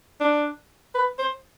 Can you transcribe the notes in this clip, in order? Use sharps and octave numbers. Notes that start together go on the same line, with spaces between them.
D4
B4
C5